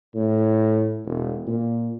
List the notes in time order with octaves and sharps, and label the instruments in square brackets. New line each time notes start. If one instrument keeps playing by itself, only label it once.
[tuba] A2
E1
A#2